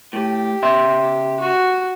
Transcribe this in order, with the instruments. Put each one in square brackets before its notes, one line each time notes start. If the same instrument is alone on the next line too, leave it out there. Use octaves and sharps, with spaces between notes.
[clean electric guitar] A2 [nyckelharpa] G4
[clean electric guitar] C#3 E5 C6
[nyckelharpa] F#4